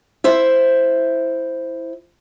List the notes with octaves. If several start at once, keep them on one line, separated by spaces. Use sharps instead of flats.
E4 C5 E5